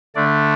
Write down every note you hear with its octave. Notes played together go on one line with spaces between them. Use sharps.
D3 A3 D4 D5